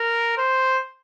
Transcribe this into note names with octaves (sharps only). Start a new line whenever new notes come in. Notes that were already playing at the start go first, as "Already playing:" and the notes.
Already playing: A#4
C5